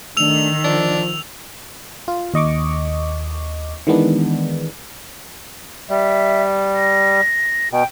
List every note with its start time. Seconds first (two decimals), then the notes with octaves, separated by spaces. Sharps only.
0.17 D#3 A3 D4 E6 F7
0.64 F3 D4
2.08 F4
2.34 D#2 D#5 C#6 D6
3.87 D#3 E3 G#3 B3 D4
5.90 G3 E5
6.75 A#6
7.72 B2 G5